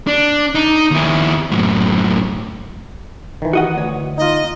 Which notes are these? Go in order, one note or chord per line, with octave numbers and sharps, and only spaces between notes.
D4
D#4
D#2 E4
F#2 A2
D#3 E3
F#4 D#5 F#5
D2 C#5
D#4 F4 D#5